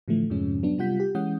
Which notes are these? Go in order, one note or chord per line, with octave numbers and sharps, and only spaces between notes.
A2 D3 E3 F3 A3
F2 G#2 C3 F3 G#3 C#4
F#3 B3 D4
C3 G3 F4 F#5 G6 B6
G4
E3 G#3 C#4 F#5 D#6 G6